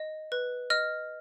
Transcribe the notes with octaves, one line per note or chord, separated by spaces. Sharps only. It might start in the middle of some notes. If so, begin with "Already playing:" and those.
Already playing: D#5
B4
D#5 F6